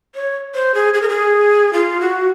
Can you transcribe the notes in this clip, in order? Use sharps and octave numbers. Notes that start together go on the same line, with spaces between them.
C#5
C5
G#4
G#4
A#4
G#4
F4
F#4